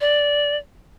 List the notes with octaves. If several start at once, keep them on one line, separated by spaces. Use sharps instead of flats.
D5